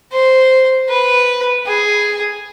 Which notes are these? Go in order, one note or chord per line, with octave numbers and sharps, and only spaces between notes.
C5
B4
G#4